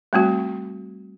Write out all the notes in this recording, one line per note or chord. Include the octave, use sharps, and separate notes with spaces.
G3 A3 C4 F#4